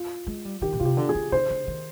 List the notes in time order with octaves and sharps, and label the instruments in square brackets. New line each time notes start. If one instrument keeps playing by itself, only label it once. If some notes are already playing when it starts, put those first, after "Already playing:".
Already playing: [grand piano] F4
[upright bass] G#3
G3
[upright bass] D#3 [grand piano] G4
[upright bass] A#2
[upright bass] C3 [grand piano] F4
[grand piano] G4
[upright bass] D3
[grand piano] G#4
[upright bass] D3
[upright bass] D3 [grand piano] C5
[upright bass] D3
D#3